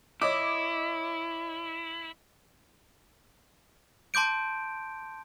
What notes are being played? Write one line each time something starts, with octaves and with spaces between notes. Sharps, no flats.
E4 C#5 D#5 D6
A5 C6 D6 G6 D7